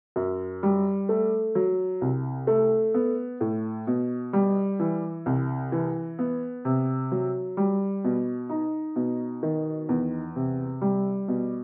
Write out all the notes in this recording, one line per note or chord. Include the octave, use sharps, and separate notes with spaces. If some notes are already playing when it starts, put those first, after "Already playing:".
F#2
G3
A3
F#3
C2
A3
B3
A2
B2
G3
E3
C2
E3
B3
C3
F#3
G3
B2
D#4
B2
D#3
E2
C3
G3
B2